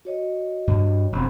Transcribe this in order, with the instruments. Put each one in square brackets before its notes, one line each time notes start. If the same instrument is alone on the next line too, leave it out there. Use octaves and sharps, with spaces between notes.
[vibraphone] F#4 C#5 D#5
[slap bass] G2
E1 C4